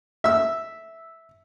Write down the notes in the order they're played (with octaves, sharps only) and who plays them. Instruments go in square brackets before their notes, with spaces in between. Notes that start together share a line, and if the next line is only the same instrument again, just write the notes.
[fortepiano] E5 E6